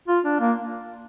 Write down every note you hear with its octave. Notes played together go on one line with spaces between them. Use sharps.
F4
D4
A#3